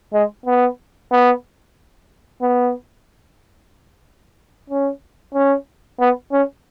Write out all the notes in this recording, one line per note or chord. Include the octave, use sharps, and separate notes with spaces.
G#3
B3
B3
B3
C#4
C#4
B3
C#4